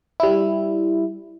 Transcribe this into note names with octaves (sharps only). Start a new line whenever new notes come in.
G3 E4